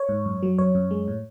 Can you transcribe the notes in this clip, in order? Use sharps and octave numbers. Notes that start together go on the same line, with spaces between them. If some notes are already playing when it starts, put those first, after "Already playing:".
Already playing: C#5
G#2
F#2
F#3
F#2 C#5
F#2
G#3
A2